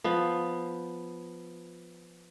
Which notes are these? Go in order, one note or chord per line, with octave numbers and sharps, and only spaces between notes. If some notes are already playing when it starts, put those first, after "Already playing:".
F3 B3